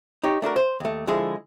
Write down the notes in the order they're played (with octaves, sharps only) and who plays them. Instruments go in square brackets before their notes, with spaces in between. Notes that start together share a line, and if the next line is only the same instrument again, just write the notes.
[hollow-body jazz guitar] D#4 G4 C#5
A3 D4 F#4 A#4
C5
D#2 A3
D3 F3 G#3 E4 G#4